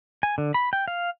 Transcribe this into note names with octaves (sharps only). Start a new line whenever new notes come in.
G#5
D3
B5
G5
F5